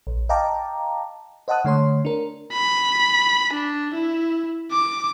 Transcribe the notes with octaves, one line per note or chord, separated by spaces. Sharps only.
A#1
D#5 F5 G5 A5 A#5 D6
C5 D#5 F#5 A5 D#6 F#6
D3 A3 C#5 C6
D4 A#4
B5
D4
E4
D6